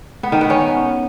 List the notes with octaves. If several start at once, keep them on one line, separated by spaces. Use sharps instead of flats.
B3
D#3
B3
C#4